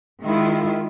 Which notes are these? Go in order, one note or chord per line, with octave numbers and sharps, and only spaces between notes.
D#3 G#3 E4 F4